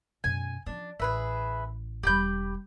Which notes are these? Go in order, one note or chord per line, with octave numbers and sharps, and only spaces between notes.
F#2 B2 G#5
F3 C#4 D4
A1 G#4 B4 E5
E1 G3 G4 B5 G6